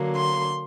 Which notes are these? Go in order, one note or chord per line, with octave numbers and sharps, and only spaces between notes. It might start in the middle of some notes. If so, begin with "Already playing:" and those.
Already playing: D3 F#3 A#3
C6